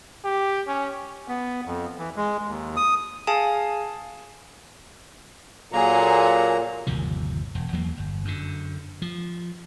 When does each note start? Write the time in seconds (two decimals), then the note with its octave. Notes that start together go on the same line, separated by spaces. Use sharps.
0.25 G4
0.67 C#4
1.28 B3
1.66 F2
1.98 E3
2.16 G#3
2.48 D#2
2.77 D#6
3.27 G#4 F5 G#5 A5
5.73 A#2 F#3 A#3 G#4 A4 F#5 A#5
6.87 G1 D#2 C3 F3
7.55 E1
7.73 E2 F#3 A#3
7.97 G1
8.25 F#2 D3
9.02 F3